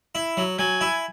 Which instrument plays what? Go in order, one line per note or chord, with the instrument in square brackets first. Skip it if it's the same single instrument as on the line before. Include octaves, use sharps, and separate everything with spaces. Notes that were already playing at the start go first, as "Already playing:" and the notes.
[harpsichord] E4
F#3
[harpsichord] F#3 [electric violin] G#5
[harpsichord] E4